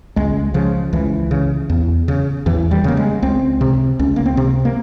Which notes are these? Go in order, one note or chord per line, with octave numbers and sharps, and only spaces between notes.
C#2 G#3
C#3 F3
C#2 E3
C#3
E2
C#3
E2 E3
G3
C#3 A#3
G#3
C#2 C4
C3
C#2 C#4
A#3
C4
C3
A#3